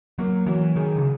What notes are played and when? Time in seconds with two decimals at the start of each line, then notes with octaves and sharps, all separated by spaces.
0.18 F#3 A#3
0.46 E3 F#3
0.76 D#3 G#4
0.96 C#3